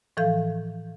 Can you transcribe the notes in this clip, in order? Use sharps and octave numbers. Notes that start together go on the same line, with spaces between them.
A2 E3 F3 A4 F5 G6